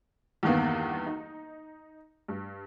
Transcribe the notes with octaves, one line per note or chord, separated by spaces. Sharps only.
E2 G2 D#3 A#3 B3
D#4
G2